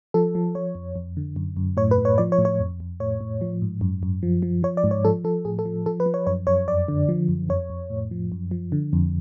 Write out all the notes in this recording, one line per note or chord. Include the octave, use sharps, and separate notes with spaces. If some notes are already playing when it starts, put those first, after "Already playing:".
F3 A4
F3
F3 C#5
F2
F2
D3
F#2
F#2
A2 C#5
B4
A2
C#5
F3 D5
C#5
A2
C#5
F2
F2
A2 C#5
A2
F3
G#2
F#2
F#2
F3
F3
F3 C#5
D5
G#2
C#5
F3 A4
F3 A4
A2 G#4
A4
F3
F3 A4
B4
F3
C#5
F#2 C#5
F#2 C#5
F2 D5
D3
F3
F#2
F2 C#5
F2
A2
F3
F#2
F3
D3
F2